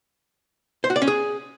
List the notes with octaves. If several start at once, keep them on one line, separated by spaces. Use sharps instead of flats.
C5
F#4
D5
C#4
G#4